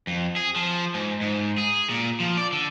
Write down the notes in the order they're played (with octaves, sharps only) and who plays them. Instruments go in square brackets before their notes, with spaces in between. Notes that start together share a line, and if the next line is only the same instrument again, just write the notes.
[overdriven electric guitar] F2
G#4
F3
G#2
G#2
G#4
A#2
F3
D5
D3